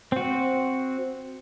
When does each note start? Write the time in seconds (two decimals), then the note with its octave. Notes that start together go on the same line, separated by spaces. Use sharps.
0.12 C4 F#4